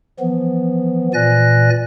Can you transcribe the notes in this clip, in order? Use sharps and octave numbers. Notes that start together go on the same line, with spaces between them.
E3 F3 B3
A#2 E3 D5 G#5 F#6 A#6